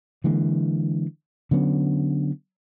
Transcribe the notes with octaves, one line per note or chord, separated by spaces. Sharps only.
D3 E3 G#3 A#3
D3 F#3 B3 C#4